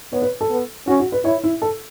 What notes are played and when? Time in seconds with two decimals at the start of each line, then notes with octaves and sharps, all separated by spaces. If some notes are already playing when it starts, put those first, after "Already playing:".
0.12 B3 C#5
0.22 B4
0.41 A4
0.50 B3
0.87 C#4 F#4
1.00 F#4
1.12 B4
1.24 E4 C#5
1.44 E4
1.62 A4